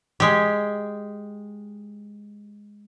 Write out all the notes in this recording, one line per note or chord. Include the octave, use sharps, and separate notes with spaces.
G#3 G4